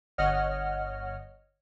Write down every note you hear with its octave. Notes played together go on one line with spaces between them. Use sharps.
G1 C#5 D#5 F#5 F6